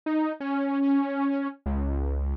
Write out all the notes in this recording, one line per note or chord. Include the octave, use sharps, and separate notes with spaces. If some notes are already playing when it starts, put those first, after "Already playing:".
D#4
C#4
C#2